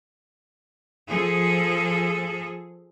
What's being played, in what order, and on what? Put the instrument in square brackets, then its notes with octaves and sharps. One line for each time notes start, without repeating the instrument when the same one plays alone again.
[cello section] F3 G#4 A4